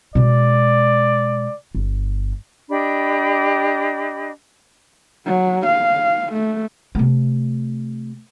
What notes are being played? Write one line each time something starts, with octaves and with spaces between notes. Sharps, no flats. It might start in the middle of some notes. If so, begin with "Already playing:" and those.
B2 G#3 D5
G1
D4 G4 D#5 B5
F#3
F5
A3
C3 A3